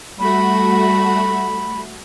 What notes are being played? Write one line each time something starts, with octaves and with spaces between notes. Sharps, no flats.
G3 A3 F#4 B5